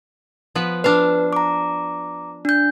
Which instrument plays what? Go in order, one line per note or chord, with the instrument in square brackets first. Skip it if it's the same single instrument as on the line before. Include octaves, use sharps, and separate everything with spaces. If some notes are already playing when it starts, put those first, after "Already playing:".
[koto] F3 B3 B4
[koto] D4 F5 [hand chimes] B4
[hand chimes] A#5 D6
D4 G6